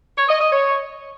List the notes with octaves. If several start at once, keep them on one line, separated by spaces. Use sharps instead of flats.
C#5
D#5
D#5
C#5